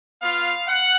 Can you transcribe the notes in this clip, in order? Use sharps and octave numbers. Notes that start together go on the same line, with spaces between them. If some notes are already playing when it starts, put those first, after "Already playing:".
B3 F4 F5
F#5